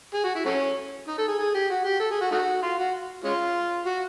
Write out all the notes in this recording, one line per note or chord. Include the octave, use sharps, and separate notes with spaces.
G#4
F#4
E4
F#3 A3 C#4
D#4
A4
G#4
G#4
G4
F#4
G4
A4
G#4
F#4
A3 D#4 F#4
F4
F#4
G#3 C#4 F4
F#4